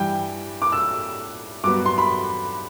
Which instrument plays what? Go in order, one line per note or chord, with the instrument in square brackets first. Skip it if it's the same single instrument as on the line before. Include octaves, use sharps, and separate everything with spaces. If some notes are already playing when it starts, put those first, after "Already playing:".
Already playing: [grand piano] G2 E3 G3 G5
D6
E6
G2 F#3 B3 D6
C6
B5